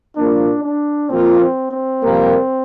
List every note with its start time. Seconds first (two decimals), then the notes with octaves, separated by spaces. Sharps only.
0.16 C2 A#2 F3 A#3 D4
0.63 D4
1.09 A#2 F3 A#3 C4 F4
1.40 C4
1.71 C4
2.03 F2 C3 G3 A#3